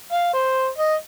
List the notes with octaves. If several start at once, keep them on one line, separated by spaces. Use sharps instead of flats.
F5
C5
D#5